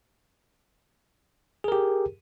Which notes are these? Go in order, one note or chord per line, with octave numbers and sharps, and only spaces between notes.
G4 G#4 A#4